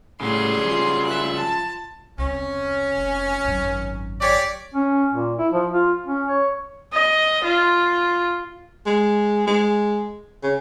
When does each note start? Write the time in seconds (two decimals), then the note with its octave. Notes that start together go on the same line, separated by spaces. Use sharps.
0.21 A2 C#3 F#3 G3 G#4 C6
0.65 F3 F4
1.07 E5 F#6
1.38 A5
2.18 E1 C2 C#4
2.98 F1
3.45 G#1 F#2
4.21 G4 C#5 D5
4.74 C#4
5.13 A#2
5.38 E4
5.53 F3
5.73 F4
6.06 C#4
6.28 C#5
6.92 D#5
7.44 F4
8.86 G#3
9.47 G#3
10.43 C#3